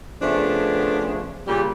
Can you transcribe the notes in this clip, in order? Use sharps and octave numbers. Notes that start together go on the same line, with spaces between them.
C#3 F3 A3 B3 D4
A#2 C#3 G3